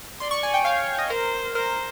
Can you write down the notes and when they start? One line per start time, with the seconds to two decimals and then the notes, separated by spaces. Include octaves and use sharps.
0.20 D5 C6
0.31 C#6
0.43 G#5
0.54 G5
0.65 C#5 F5
0.99 D#5
1.10 A#4 C5
1.55 A#4 C5